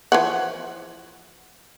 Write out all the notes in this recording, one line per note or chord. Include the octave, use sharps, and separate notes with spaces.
E3 F3 F#5